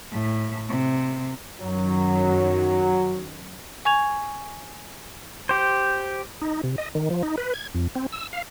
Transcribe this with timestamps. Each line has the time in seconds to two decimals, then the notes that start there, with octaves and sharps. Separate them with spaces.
0.11 A2
0.69 C3
1.61 F#2 D#3 F#3
3.85 G#5 C#6 G#6 F7
5.49 G4 C5
6.42 D#4
6.64 C3
6.78 D#5
6.95 D#3
7.10 F3
7.23 D#4
7.38 B4
7.54 G#6
7.75 F2
7.95 C4
8.12 E6
8.33 F5